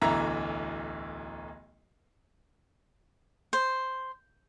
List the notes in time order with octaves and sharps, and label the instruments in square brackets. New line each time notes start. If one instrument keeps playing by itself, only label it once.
[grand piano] D1 B1 D3 E3 E5 A#5
[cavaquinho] C5